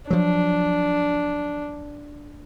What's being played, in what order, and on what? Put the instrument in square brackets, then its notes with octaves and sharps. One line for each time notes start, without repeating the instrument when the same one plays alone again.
[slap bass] F3 F#3 [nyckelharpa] D4